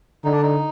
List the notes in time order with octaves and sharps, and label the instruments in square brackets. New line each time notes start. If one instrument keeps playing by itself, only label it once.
[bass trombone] D3 [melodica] D#4
[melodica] D4
D#4